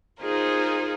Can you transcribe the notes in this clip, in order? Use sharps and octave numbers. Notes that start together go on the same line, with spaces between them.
D#4 F4 G#4 A#4 C5